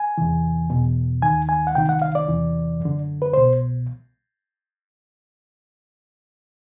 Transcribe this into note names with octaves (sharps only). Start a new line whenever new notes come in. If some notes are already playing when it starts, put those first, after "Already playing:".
Already playing: G#5
E2 C3 E3
E2 B2
D#2 D#3 G#5
G#5
F#5
C2 C3 D#3 G5
F#5
F5
D5
E2 C3 E3
F#2
D3
B4
C2 B2 C5